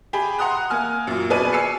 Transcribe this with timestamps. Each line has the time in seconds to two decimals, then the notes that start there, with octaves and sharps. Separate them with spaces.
0.13 G4 G#4 B5
0.39 F#5 A#5 C6 D#6 F#6
0.70 A#3 G#5 F6
1.07 F#2 A#2
1.30 B2 G#4 B4 D5 G#5 D#7
1.53 G#5 E6 C7 C#7